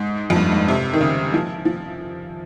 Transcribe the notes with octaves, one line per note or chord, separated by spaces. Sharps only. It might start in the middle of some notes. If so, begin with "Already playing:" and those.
Already playing: G#2
F2
G2
G#2
C3
D#3
C#3
F3
F3